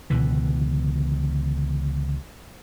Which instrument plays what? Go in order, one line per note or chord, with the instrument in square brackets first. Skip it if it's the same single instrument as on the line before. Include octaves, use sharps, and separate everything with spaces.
[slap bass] C#2 B2 D3 E3